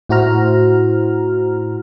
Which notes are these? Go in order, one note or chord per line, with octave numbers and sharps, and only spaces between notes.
A2 E4 F#4 C5 A#5 F6